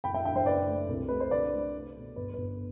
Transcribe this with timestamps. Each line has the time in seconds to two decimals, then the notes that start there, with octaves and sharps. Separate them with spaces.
0.04 F#1 G5 B5
0.14 E5 G5
0.25 D3 E5 G5
0.36 C5 E5
0.46 F#1 B4 D5
0.68 A3
0.89 C2
1.09 A3 B4
1.20 C5
1.31 D3 B4 D5
1.53 A3
1.74 A3
1.95 B2
2.16 G1 B4
2.34 G1 B4